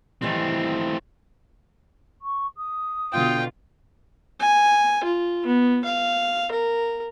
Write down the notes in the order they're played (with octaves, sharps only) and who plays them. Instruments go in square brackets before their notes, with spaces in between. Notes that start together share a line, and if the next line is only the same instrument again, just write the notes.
[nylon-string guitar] D#3 E3 G3 [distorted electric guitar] A3 C4
[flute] C#6
D#6
[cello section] B2 D3 [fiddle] F4 [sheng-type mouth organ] G5
[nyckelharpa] G#5
F4
B3
F5
A#4